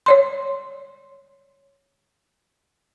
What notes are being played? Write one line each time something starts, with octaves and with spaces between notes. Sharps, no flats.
C#5 D5 C6